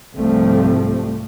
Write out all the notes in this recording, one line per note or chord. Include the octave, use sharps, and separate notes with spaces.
C2 G#2 F3 G3 A3 C4